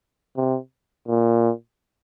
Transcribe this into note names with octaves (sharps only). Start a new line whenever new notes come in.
C3
A#2